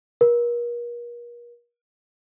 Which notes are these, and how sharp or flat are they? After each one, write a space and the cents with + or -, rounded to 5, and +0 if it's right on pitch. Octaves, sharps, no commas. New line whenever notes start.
A#4 +40